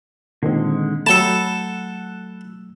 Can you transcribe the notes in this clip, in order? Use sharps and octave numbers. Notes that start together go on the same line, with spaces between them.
A#2 D3 D#3 G#3 C4
F#3 A3 A4 F#5 G5 A5 B5